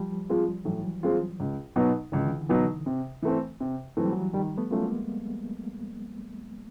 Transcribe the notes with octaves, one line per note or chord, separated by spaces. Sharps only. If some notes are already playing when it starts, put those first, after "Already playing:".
Already playing: F3 G3
F3 G#3 C4 F4
A2 E3 F#3
F3 G#3 C4 F4
C#2
B2 F#3 B3 D#4
C#2 D3 E3
B2 F#3 B3 D#4
C3
E3 A3 C4
C3
E3 F#3 A3 C4
G3
E3 F#3
D#3 F3 G3
A3 B3
F#3 A3 C#4 F4
G#3 A#3